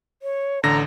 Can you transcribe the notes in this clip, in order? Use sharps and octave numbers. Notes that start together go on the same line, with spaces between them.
C#5
A1 D3 A#5 A#6